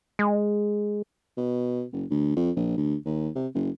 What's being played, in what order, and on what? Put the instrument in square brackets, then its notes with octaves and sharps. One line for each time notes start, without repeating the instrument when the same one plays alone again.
[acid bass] G#3
[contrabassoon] B2
F#1
D2
F2
A#1
D2
D#2
C3
F#1